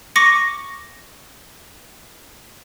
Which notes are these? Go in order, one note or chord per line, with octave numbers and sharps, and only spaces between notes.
C#6 D6 A#6 C#7